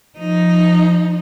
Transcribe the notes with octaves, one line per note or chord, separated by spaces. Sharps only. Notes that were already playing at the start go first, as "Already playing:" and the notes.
F3 D#4